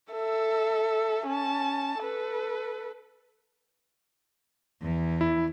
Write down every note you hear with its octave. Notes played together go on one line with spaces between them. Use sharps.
A4 E5
C#4 A5
A4 B4
E2 E3
E4